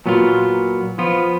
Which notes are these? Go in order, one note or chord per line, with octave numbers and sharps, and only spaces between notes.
A#2 F#3 B3 F4
F3 B3 F4